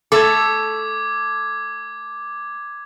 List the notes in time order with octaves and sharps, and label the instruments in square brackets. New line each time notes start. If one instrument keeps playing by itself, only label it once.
[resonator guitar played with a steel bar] A3 A4 [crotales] D6 G#6